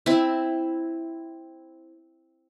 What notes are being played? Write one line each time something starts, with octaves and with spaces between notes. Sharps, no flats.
C4 E4